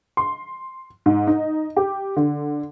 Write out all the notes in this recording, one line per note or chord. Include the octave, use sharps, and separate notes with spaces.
C6
G#2
D#4
G4
D3